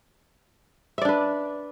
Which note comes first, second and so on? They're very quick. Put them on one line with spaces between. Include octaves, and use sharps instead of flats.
E5 D5 D4 B4